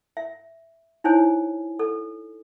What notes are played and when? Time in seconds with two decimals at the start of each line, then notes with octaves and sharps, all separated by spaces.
0.17 E5
1.04 D#4 E4 C5 C#5 G#5
1.79 A4